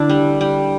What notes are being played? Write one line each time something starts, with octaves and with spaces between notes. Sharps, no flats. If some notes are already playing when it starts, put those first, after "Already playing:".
Already playing: D3 D4 E4
G3
G3